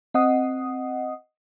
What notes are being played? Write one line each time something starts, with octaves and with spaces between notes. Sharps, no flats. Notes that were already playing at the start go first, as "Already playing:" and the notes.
C4 D#5 F#5 D#6